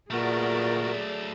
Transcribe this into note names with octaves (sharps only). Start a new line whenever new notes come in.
A#2 F#3 A3 B3 F#4 G#4 A#4 D5